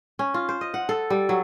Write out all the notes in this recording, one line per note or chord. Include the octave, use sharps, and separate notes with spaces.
C#4
F4
C5
D#5
F#5
A4
G3
F#3